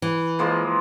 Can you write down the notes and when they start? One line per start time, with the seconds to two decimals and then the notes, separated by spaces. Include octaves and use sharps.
0.02 E3
0.39 F3 G#3 A#3